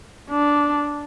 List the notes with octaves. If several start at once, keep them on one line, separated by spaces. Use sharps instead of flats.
D4